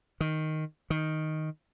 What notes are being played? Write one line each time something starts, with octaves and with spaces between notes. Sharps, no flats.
D#3
D#3